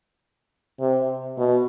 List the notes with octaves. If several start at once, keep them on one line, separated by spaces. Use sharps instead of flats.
C3
B2